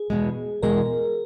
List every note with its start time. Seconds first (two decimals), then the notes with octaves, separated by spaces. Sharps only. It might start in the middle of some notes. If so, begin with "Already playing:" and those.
Already playing: G#4
0.10 E2 B2 G#3
0.63 E2 B2 G#3 A#4